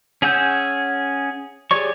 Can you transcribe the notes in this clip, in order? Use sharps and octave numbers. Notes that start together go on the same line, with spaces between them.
C#4 G#4 F#5 E6 G6
G4 G#4 C#5 D5 C#6